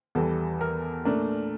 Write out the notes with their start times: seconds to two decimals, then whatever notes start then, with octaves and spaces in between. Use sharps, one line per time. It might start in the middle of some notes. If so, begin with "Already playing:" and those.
0.15 E2 E3 G3 A4
0.61 A#4
1.05 A#2 A3 D4 A#4